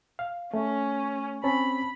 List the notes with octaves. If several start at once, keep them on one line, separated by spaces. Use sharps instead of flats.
F5
A3 C#4
C4 C#4 A5 B5